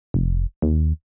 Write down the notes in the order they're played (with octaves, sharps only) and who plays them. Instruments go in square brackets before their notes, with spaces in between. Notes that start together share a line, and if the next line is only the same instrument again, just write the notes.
[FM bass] F1
D#2